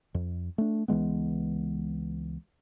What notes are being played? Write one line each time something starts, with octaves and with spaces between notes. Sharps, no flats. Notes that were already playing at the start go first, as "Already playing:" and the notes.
F2
A3 D4
C#2 E3 G#3 B3